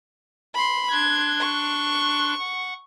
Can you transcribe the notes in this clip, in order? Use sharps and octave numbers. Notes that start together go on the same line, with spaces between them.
B5 C6
D4 C6 F#6 G#6
C#6
F#5